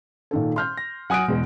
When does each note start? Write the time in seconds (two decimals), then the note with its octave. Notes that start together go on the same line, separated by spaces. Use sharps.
0.31 A#2 D#3 A4
0.56 C6 F6 G6
0.77 A#6
1.10 F#3 F#5 G#5 D#6 F#6 D7
1.28 E2 B2 G#3